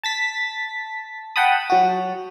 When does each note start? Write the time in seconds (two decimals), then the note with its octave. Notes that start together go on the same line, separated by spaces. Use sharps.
0.03 A5 A6 B6
1.36 F#5 G5 A5 B5 D#6
1.70 F#3 F#4